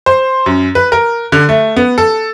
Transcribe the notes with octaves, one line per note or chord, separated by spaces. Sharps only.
C5
F#2
B4
A#4
D3
A3
B3
A4